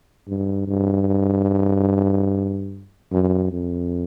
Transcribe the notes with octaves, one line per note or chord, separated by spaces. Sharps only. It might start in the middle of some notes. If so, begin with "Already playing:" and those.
G2
G2
F#2
F2